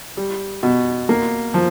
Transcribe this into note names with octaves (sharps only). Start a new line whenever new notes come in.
G3
B2
A#3
F3